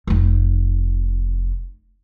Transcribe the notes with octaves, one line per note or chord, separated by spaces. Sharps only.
F1 D#4